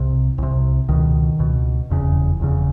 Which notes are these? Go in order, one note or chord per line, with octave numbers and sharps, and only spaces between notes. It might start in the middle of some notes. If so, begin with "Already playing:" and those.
Already playing: C2 C3
C2 C3
C#2 B2 D#3
C#2 B2
F1 E2 C#3
F1 E2 C#3